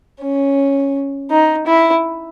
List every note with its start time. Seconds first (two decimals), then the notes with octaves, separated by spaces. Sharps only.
0.22 C#4
1.30 D#4
1.67 E4